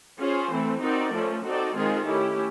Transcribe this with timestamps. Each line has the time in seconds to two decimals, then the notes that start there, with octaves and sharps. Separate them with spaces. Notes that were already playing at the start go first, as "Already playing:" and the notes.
0.20 C#4 F4 G#4 C5
0.51 E3 A3 C4
0.82 C4 D#4 F#4 A#4 D5
1.13 F3 A3 C#4
1.44 C4 D#4 F#4 A4 D5
1.76 D#3 G#3 C4 F4 G#4
2.07 A3 C#4 E4 G4